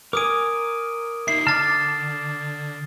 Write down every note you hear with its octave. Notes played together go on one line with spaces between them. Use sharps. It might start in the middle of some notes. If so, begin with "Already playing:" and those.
A#4 G#5 D6 D#6 D7
D#4 E5 C7
D3 A5 D6 F6 A6